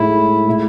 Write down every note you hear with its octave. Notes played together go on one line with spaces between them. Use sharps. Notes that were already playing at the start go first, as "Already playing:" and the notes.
Already playing: A2 G#3 D#4 E4 A4
A2 G#3